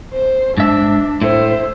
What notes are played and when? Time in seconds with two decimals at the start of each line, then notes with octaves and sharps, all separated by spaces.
0.14 C5
0.58 G#2 D4 E5
1.22 A2 C5 E5